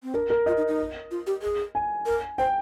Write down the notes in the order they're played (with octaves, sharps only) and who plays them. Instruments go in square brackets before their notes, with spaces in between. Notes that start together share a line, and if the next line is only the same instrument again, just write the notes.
[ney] C4
[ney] D4 [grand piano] A#4
[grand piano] A#4
[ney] F4 [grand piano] D#5
[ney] D#4
D#4
F4
G4
G#4
[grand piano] G#5
[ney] A#4
[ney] C5 [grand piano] G5